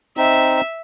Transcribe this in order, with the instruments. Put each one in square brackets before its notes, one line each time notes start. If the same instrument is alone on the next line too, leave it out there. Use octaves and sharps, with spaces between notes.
[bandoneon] C4 D#4 [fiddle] E5